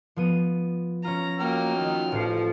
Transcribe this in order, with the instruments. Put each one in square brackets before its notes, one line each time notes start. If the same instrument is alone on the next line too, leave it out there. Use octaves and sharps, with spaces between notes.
[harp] F3 B3 D#7
[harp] C#4 F4 [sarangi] A#5
[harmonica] F#3 G5 F6 [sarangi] A#3 [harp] A#5
[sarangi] D#3
[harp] A1 C7 [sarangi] F3